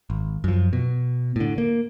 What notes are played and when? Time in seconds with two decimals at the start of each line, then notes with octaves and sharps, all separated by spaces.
0.10 G#1
0.44 F#2 F3
0.73 B2
1.36 A2 D3
1.58 A#3